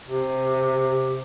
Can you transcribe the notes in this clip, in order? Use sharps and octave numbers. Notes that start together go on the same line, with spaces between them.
C3